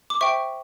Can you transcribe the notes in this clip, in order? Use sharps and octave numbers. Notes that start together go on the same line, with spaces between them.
D6
C5 E5 G5 C#6